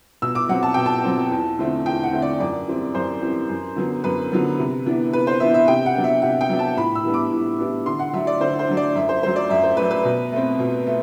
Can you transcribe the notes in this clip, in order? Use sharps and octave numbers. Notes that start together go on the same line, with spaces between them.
B2 E6
D6
F#3 C4 F#5
A5
B2 G5
A5
F#3 C4
E2
D3 A3 C4
E2 G5
F#5
D3 A3 C4
D5
F#2 D5
E3 G3 C4
F#2 C5
E3 G3 C4
F#2
D3 F#3 B3
F#2 B4
D3 F#3 B3
C3
E3 B3 D4
C3 B4
C5
E3 B3 D4 E5
E5
C3 G5
F#5
F#3 B3 D4
E5
C3 F#5
G5
F#3 B3 D4
A5
A2 B5
E6
E3 G3 B3 D4
D6
A2
E3 G3 B3 D4
D3 C6
F#5
F#3 A3 D4 E5
D5
D3 C5
C5
F#3 A3 D4
D5
F#2 E5
C5
F#3 A3 C5
D5
F#2 E5
C5
F#3 A3 B4
B4
B2
A3 C4
B2
A3